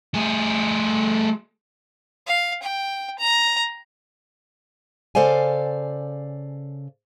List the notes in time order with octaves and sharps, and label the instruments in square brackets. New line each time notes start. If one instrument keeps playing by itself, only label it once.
[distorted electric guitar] A3 G#4
[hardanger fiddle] F5
G5
A#5
[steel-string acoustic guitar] C#3 A4 C5 D5 F5 G#5